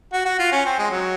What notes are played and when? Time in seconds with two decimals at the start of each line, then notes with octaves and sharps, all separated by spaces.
0.13 F#4
0.26 F#4
0.39 F4
0.52 C#4
0.65 C4
0.79 G#3
0.91 F#3